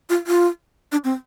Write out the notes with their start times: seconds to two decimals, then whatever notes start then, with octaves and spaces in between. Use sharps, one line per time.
0.10 F4
0.27 F4
0.92 D4
1.04 C4